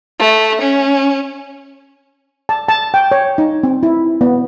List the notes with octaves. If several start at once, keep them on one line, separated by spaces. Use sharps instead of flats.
A3
C#4
A5
A5
G5
C#5
D#4
C4
E4
B3